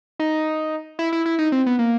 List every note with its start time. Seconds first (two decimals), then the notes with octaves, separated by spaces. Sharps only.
0.19 D#4
0.99 E4
1.12 E4
1.26 E4
1.39 D#4
1.52 C4
1.66 B3
1.79 A#3